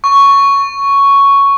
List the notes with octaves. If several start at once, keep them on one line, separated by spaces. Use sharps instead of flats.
C#6